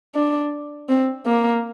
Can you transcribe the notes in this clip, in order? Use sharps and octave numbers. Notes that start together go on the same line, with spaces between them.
D4
C4
A#3